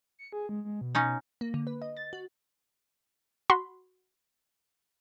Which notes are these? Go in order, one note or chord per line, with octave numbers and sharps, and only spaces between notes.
C#7
G#4
G#3
G#3
B2
C#4 D#4
A#3
D3
B4
D#5
A6
F#4
F#4 B5 C6